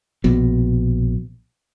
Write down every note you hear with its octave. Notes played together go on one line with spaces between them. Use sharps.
A#1 B2